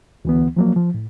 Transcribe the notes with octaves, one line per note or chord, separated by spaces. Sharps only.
D2 E3 B3
F3 F#3 A#3
F3
A2